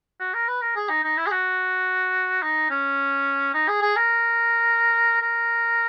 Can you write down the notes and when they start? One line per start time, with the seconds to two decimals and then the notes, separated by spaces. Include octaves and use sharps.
0.20 F#4
0.34 A#4
0.48 B4
0.62 A#4
0.76 G#4
0.89 D#4
1.04 D#4
1.17 E4
1.27 G#4
1.31 F#4
2.43 D#4
2.71 C#4
3.54 D#4
3.68 G#4
3.82 G#4
3.96 A#4
5.22 A#4